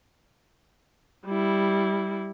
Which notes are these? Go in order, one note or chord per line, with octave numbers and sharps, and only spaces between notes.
G3 E4